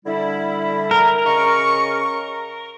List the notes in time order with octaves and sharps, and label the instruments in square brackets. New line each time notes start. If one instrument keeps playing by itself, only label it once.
[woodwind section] D3 G3 E4
[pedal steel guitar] A#4
[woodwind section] C#3 D#5 C#6